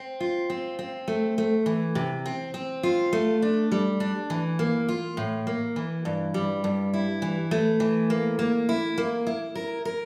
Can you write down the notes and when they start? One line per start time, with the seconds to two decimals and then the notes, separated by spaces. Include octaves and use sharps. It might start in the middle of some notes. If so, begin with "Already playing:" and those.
Already playing: C4
0.20 F4
0.50 C4
0.79 C4
1.08 A3
1.38 A3
1.66 E3
1.95 C3
2.26 C4
2.54 C4
2.83 F4
3.13 A3
3.42 D4
3.71 G3
4.00 D4
4.30 E3
4.59 A#3
4.89 F4
5.17 A2
5.47 A#3
5.76 E3
6.05 G2
6.34 G3
6.64 G2
6.93 E4
7.22 E3
7.51 A3
7.80 E3
8.10 A#3
8.39 A#3
8.69 E4
8.98 A#3
9.27 E4
9.55 A#4
9.85 A#4